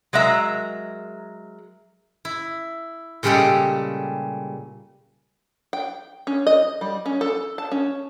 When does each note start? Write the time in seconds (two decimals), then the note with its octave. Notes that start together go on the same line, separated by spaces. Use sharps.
0.13 F#3 G#3 A#4 E5 A#5
2.25 E4
3.23 A#2 C#3 G3 G#3 G4 A4
5.73 G5
6.27 C#4
6.47 D#5
6.81 G3
7.06 C#4
7.21 A4
7.58 A5
7.72 C#4